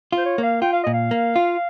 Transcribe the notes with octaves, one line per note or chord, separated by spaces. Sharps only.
F4
C5
C#5
A#3 F5
F4 G5
F5
A#2 D#5
F5
A#3
F4